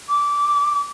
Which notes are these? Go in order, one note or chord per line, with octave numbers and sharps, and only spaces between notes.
D6